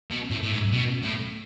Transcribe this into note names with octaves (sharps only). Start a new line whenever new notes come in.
B2
A2
A2
G#2
B2
A2